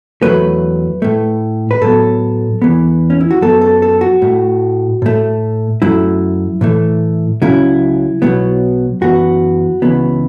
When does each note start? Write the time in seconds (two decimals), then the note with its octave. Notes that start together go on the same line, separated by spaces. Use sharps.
0.22 E2 B2 F#3 A3 B4
1.02 A2 A3
1.71 B4
1.82 A2 F#3 B3 A4
2.62 E2 E3 B3
3.10 C#4
3.21 E4
3.31 F#4
3.41 F#2 F#3 B3 A4
3.61 A4
3.82 A4
4.01 F#4
4.22 A2 A3
5.02 A2 A3
5.82 F#2 F#3 A3 E4
6.61 A2 E3 A3
7.42 C#2 C#3 F#3 E4
8.22 B1 B2 F#3 B3
9.01 F#2 E3 B3 F#4
9.82 C#2 C#3 E3 B3